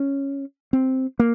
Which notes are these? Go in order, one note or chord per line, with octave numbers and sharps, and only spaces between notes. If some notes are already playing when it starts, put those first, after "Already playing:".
Already playing: C#4
C4
A#3